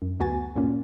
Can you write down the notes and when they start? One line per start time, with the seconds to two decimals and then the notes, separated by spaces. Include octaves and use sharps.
0.02 F#2
0.20 D2 B3 F#4 G#5 A6
0.56 G2 A#2 A#3 C#4